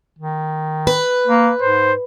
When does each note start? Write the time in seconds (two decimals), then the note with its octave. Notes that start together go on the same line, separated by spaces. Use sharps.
0.19 D#3
0.87 B4
1.27 A#3
1.61 G#2 C5